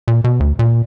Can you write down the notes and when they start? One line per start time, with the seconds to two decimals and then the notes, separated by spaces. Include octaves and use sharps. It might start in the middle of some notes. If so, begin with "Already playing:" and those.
0.08 A#2
0.24 B2
0.40 D2
0.59 A#2